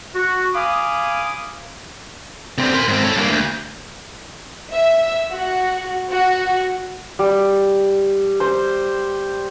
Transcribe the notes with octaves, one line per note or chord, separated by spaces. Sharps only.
F#4
F5 G#5 B5 D6 D#6
D3 C4
A#4 C6
G#2 C4
A4 C#5
G2 A#3
D2
E5
F#4
F#4
G3
C5